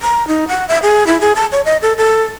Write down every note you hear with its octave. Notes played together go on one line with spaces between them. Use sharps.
A#5
D#4
F#5
E5
G#4
E4
G#4
A5
C#5
D#5
A4
A4